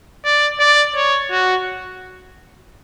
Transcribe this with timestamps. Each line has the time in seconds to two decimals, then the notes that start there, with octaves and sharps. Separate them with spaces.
0.25 D5
0.60 D5
0.95 C#5
1.31 F#4